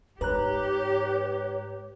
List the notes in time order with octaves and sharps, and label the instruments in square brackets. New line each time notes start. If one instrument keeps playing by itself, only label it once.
[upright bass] G#2 [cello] G4 [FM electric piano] B4 A#5 F#6 [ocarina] C#5